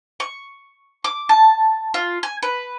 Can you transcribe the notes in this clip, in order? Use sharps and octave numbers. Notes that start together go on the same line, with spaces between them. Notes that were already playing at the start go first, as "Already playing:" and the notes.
C#6
D6
A5
F4
G#5
B4